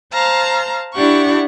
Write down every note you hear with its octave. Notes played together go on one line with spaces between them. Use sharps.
C5 F5 A5 A#5
D4 E4 G4 F#5 C#6